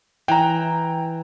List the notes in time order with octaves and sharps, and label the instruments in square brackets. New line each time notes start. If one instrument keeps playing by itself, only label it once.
[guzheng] E3 [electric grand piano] G5 A#5